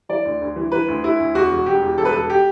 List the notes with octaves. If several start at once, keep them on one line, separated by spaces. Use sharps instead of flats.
E3 D5
D2
D2
E3
E3 B4
D2
D2 E4
D2
E2 F#4
E1
E1 G4
E2
E1 A4
B4
E1 A4
G4